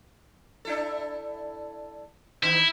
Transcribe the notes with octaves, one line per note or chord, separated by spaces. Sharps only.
D4 E4 A4
D#3 B3 D#4 E4